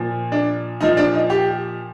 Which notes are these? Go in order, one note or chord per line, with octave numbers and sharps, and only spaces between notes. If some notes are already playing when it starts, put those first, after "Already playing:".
Already playing: A#2 F3
D4
A#2 F3 D#4
D4
D#4
G4